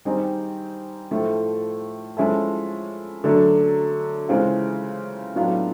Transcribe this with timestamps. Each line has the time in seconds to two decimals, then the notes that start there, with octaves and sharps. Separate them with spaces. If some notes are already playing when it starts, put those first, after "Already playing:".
0.05 D#3 G3 C4 D#4 G#4
1.11 A2 F3 A3
2.17 F3 G#3 C#4 E4 A4
3.24 D3 F#3 A3 D4
4.29 C#3 E3 G#3 C4 F4
5.35 A2 F#3 B3 D4 F4